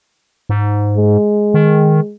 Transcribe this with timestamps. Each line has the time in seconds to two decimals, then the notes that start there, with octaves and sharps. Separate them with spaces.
0.49 G#2
0.97 G#3
1.54 D#3